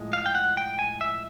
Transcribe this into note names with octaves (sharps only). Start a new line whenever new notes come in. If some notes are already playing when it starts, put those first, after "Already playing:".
Already playing: A2 F3 G#3
F5
G5
F#5
G5
G#5
E5